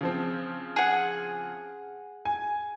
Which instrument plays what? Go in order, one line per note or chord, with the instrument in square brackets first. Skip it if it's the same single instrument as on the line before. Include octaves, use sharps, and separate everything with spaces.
[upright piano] C#3 F3 C4
[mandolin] G#4 F#5
[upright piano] G#5